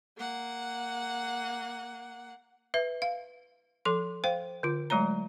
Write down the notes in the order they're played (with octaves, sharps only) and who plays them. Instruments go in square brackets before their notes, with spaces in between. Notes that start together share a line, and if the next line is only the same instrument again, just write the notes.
[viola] A#3 F#5
[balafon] B4 E5
F5
F3 A4 C6
C5 F5 G5
D3 F4
F#3 G#3 A3 C#5 A#5